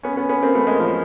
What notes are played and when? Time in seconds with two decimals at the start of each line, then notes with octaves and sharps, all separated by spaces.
0.03 B3 C#4
0.16 B3 C#4
0.29 B3 C#4
0.43 A#3 C4
0.55 A3 B3
0.67 G#3 A#3
0.80 F3